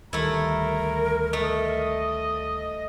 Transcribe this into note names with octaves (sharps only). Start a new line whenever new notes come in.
D2 D#3 G3 A3 E4 A#4 A#5
A3 D#5